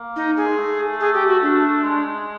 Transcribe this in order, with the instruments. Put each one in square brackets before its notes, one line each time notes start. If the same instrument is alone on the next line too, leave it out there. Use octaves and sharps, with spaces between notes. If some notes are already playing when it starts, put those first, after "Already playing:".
Already playing: [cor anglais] A#3
[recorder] D#4
G#4
[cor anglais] G#3
A3
[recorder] G#4
G4
F#4
D4
[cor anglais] G#3